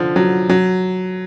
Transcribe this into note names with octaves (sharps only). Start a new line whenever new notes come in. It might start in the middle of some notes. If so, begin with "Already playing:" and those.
Already playing: D3 F3
F#3
F#3